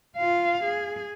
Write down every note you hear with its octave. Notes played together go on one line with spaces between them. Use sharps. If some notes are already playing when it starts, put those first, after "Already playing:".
F4 F5
G#4